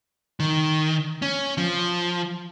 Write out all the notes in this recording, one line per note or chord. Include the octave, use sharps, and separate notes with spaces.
D#3
C#4
F3